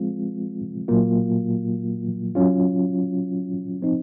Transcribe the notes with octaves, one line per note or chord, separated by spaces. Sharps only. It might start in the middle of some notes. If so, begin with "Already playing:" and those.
Already playing: F3 G#3 C4 F4
A#2 F#3 A#3 F4
F#3 C#4 F4
F3 C4 D#4